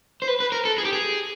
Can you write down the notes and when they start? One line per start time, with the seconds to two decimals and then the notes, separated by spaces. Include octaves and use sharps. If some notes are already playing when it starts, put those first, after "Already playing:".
0.22 C5
0.28 B4
0.40 B4
0.52 A#4
0.65 A4
0.78 G#4
0.85 G4
0.93 G#4